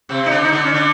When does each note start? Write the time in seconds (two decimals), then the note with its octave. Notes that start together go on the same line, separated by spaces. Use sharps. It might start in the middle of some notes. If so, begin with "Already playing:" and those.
0.09 C3 C4
0.26 D#4
0.30 D3 D4
0.43 D#4
0.52 D3 D4
0.64 C#4
0.74 D3 D4